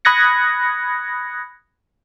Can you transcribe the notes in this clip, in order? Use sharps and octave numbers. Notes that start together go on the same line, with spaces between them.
B5 D#6 F#6 G#6 A#6 C#7